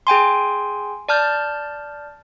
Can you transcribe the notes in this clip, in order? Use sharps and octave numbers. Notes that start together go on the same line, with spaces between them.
G#4 G5 G#5 C6
D5 A5 F6 G6